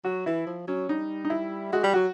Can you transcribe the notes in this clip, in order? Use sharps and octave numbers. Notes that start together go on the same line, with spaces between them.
F#3 F#4
E3 E4
F3
F#3 C#4
G3 D#4
D#4
E4
G#3 F#4
G3 G4
F#3 F#4